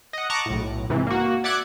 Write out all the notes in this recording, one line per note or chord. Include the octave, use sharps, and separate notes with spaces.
D#5 F#5
A5 A#5 C#6 D6 F#6
B1 A2
G#2 C3 E3
A#3 F#4
D5 E5 F#5 D6 F#6 G#6